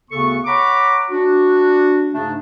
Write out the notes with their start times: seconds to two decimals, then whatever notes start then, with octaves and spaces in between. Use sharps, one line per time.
0.11 D2 C#3 B3 A4 C#6
0.45 C#5 F#5 A#5 B5 C#6 D6
1.11 D4 F#4
2.14 G#2 C#3 A3 D4